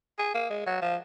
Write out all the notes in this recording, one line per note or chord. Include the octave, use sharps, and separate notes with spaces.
G#4
A#3
G#3
F#3
F3